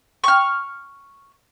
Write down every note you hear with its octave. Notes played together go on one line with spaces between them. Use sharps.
C#6 F6